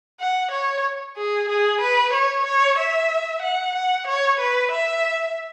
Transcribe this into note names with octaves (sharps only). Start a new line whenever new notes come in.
F#5
C#5
G#4
G#4
B4
C#5
C#5
E5
F#5
F#5
C#5
B4
E5